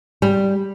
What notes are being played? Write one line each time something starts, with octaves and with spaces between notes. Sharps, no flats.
G3